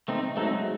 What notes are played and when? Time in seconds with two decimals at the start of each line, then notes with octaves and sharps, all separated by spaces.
0.08 A3 C4 D#4
0.37 F#3 G#3 A3 C4 D#4